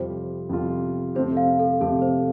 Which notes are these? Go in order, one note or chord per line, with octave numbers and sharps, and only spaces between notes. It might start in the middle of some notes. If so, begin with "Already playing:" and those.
Already playing: F2 C3 G3 F4 C5
F2 C3 G3 F4
F2 C3 A3 C4 G4 C5
F5
A4
F2 C3 A3 C4 G4 A4
C5